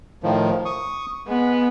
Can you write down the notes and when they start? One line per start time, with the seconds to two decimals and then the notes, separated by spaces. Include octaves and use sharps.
0.23 A2 D#3 F3
0.65 C#6 D#6
1.27 G#3 B3